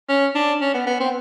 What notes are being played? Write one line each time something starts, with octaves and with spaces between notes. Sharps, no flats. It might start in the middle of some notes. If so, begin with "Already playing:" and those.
C#4
D4
C#4
B3
B3
C4